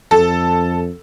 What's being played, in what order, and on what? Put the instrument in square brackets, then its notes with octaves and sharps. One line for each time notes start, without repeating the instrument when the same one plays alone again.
[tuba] F2 [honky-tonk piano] A4